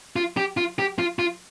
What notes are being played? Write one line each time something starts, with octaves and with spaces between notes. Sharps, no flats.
F4
G4
F4
G4
F4
F4